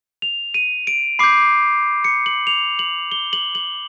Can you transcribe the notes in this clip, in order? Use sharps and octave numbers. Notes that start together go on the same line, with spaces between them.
F7
D#7
D7
B5 D6 G6 C7
C#7
F#7
F7
F#7
G7
F#7
F#7